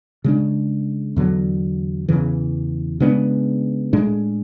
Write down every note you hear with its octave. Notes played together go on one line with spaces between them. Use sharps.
C#3 G#3 D4
E2 D3 F#3
E2 C#3 E3
C#3 G#3 B3 D4
A2 G#3 D4